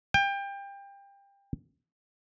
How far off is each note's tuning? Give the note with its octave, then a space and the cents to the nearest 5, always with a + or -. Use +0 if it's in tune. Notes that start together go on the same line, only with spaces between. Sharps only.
G5 +25